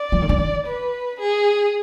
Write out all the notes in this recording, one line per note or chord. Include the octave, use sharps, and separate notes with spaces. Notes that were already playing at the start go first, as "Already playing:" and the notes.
Already playing: D5
F3
D#3
D3
D#3
B4
G#4